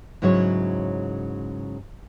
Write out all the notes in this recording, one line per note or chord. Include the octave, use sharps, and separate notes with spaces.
G#2 C#3 F#3 E4 A#4 C#5